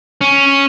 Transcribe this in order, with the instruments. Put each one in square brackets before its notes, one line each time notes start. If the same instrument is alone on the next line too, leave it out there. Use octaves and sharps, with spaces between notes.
[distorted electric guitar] C#4